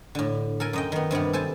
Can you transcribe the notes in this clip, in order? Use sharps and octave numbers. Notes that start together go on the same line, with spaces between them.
A2 D3
A4 A#4 G#5
F#2 D#5 G5
D#3 B3
G2 C3 D#3 B3
A4 C5 G#5 A5